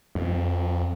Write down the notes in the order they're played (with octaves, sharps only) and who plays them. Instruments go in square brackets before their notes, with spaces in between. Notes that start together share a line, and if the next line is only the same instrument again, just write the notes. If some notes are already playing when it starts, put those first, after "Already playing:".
[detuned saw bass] F2